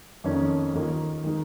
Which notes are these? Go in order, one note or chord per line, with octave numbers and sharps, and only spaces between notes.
F2 D#3 A#3 C#4
D#2 D#3 A#3 F4
D#3 G#3 D#4